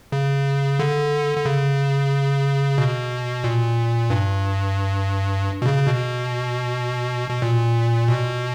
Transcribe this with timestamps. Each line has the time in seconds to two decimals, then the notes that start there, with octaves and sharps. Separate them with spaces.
0.12 C#3
0.79 D3
1.37 D3
1.45 C#3
2.78 B2
3.44 A#2
4.10 G2
5.62 B2
5.66 C#3
5.87 B2
7.30 B2
7.42 A#2
8.08 B2